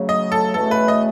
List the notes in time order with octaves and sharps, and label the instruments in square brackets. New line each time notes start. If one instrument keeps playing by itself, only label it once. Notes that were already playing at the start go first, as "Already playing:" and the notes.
Already playing: [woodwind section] C#3 F#3 A3
[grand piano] D#5
A4
[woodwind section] E2 B2 A3 C#4 [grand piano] A4
[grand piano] B4
D#5